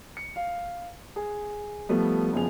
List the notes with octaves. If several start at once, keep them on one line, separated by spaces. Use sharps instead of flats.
C#7
F5
G#4
F3 G3 A3 B3
F#1 F3 B3 G#4 F7